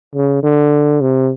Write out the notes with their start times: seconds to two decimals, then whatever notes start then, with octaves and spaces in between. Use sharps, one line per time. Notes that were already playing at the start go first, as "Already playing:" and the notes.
0.15 C#3
0.43 D3
1.01 C3